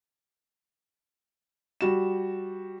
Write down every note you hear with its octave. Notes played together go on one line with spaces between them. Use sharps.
G3 F#4 E7